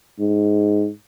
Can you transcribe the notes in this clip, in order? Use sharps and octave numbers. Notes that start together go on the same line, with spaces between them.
G#2